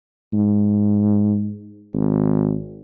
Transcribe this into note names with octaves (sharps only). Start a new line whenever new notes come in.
G#2
G#1